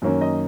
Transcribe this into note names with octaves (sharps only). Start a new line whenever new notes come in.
F#2 D#3 A#3 C#4 C#5
D#5